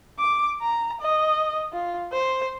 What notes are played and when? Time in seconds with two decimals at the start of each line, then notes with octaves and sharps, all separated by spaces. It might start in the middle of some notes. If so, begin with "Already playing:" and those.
0.19 D6
0.61 A#5
1.00 D#5
1.72 F4
2.12 C5